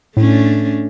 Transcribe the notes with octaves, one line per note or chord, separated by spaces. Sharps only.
A2 A3 C#4 D4